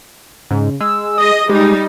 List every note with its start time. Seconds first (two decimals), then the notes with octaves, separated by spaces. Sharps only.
0.51 G#2 C#3
0.81 G#3 E6
1.18 G#4 D#5 D#6
1.49 G3 G#3 D#4 G4